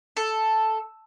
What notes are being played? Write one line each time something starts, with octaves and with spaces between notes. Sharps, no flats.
A4